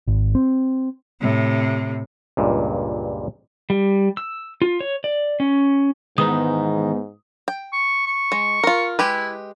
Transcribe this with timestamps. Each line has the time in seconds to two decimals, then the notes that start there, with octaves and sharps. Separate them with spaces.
0.07 G#1
0.35 C4
1.20 A2 C3
2.37 C#2 G2 A#2
3.70 G3
4.17 E6
4.62 F4
4.80 C#5
5.04 D5
5.40 C#4
6.18 G#2 D#3 E3 G#3 B3 D#4 D#6
7.48 G5
7.73 C#6
8.06 C#6
8.32 G#3
8.64 F4 A#4
8.99 G#3 E4 G4 B4